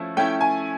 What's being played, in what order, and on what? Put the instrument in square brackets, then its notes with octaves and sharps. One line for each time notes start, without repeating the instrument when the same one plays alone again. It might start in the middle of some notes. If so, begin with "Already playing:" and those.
Already playing: [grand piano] F3 A3 C#4 E4
[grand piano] A3 C#4 E4 [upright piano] G5
[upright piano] G#5